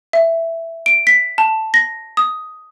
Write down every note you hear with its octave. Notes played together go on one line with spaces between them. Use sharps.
E5
D7
B6
A5
A#6
D#6